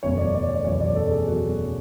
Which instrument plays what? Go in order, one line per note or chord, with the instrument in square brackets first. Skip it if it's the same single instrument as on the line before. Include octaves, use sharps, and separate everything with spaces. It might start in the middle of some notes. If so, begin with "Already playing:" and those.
[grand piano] F#1 E2 B2 F#3 A3 C#5
D5
D5
C#5
F#1 E2 B2 F#3 A3 C#5
D5
A4
G#4
B2 F#3 A3 F#4